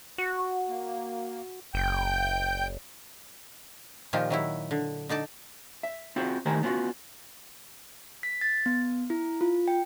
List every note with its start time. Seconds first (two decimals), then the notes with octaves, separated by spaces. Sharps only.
0.18 F#4
0.69 A#3
1.74 F#1 G5 G6
4.13 A#2 D#3 F3 F4 G4
4.30 D#3 F#3 E4
4.71 D3
5.09 D3 D#4 D5 A5
5.83 E5
6.16 C4 F4 F#4 G#4 C5
6.46 A2 D#3 G4 A#4 C5 G#5
6.63 B3 C#4 D4 F4 F#4
8.23 B6
8.41 A6
8.66 B3
9.10 E4
9.41 F4
9.68 G5